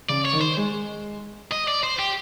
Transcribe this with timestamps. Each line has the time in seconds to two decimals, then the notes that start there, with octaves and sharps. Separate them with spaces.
0.09 C#3 D5
0.25 C#5
0.33 D#3
0.41 C5
0.57 G#3
1.52 D#5
1.68 D5
1.83 C5
1.99 G4